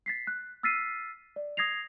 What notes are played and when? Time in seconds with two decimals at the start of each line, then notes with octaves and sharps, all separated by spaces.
0.06 A6 B6 C7
0.27 F#6
0.63 E6 F6 A6 B6 C7 D#7
1.36 D5
1.57 D#6 G#6 A#6 C7 F7